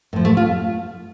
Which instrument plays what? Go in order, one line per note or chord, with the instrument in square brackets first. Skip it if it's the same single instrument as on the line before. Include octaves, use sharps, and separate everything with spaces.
[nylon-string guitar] A2 F3
A3
F4